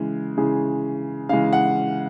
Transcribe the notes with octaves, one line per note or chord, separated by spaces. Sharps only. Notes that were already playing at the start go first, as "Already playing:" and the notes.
Already playing: C#3 E3 G#3
C#3 E3 G#3
C#3 E3 G#3 F5
F#5